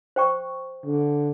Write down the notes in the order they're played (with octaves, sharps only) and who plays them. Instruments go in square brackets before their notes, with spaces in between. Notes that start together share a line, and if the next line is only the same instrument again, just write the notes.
[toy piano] C5 G5 C#6
[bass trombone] D3